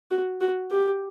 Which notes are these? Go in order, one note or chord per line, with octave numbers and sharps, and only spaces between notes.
F#4
F#4
G4